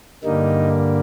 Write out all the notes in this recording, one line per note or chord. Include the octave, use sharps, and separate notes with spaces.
G2 D3 G3 A#3 D#4